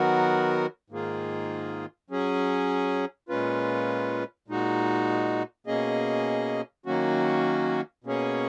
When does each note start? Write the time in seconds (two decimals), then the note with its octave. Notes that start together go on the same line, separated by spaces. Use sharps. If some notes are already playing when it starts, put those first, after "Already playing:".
Already playing: D#3 F#3 B3 F#4 A#4
0.90 G#2 D#3 A#3 F4 G#4
2.10 F#3 C#4 G#4
3.29 A#2 G#3 C#4 F4 B4
4.48 A#2 G#3 D#4 F#4
5.67 B2 A#3 C#4 G#4 D#5
6.86 D#3 F#3 A#3 C#4 F#4
8.04 B2 A#3 C#4 G#4 C#5